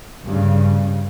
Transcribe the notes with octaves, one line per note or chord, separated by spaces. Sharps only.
G2 C#3